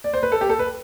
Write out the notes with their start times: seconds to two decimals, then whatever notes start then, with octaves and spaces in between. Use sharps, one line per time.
0.04 D5
0.14 C5
0.23 B4
0.32 A4
0.41 G4
0.49 A4
0.59 B4